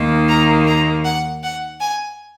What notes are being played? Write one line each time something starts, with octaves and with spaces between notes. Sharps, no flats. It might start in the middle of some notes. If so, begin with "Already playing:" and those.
Already playing: D#2 D#3 A#3
A#5
A#5
F#5
F#5
G#5